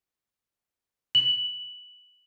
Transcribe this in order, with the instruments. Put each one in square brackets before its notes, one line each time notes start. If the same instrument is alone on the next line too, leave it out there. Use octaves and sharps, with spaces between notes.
[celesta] F#7